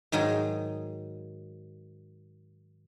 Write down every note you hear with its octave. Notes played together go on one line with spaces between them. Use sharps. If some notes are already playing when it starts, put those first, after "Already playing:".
G#2 D#3 F#3 D#4 G#4